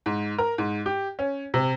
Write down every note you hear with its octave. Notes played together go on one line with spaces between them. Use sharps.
G#2
A#4
G#2
G4
C#4
C3